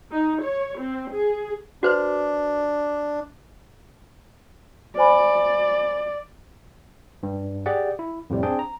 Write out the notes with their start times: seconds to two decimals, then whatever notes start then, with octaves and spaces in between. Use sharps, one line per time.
0.12 D#4
0.43 C#5
0.80 C4
1.12 G#4
1.83 D4 F#4 B4 C5
4.97 C5 D5 G#5 B5
7.23 G2
7.66 G4 G#4 D5 F#5
7.99 E4
8.30 F2 A2 C3 G3
8.43 C4 D4 G#4 G5
8.59 A#5